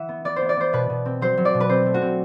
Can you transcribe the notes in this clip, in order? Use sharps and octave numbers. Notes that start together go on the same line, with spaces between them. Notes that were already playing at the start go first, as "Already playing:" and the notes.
Already playing: E3 E5 F#5
B3
B3 D5
B3 C5
D5
B3 C5
B2 B4
B2
C4
F#3 C5
F#3
D5
B2
B4
C4 C5
A3
F#4
C4